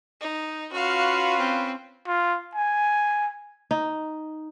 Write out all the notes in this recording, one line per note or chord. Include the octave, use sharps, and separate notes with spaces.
D#4
C#4 F4 F#4 B4 F5
C4
F4
G#5
D#4